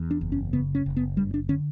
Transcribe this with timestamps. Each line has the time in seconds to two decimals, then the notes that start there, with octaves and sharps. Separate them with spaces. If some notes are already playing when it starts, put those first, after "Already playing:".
Already playing: E2
0.11 D4
0.21 F#1
0.32 C#4
0.53 C#3 B3
0.75 C#4
0.86 F#1
0.97 B3
1.17 G2 G3
1.34 D4
1.49 D3 C#4